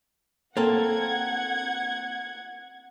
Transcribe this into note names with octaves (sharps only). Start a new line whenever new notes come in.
A#3 C4 A4 F#5 G#6